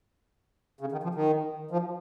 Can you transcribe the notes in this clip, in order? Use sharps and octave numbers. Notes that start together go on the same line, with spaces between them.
C#3
D#3
F3
D#3
F3